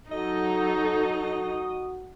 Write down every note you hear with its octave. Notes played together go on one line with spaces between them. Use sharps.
F#3 D#4 F#4 A4 D#5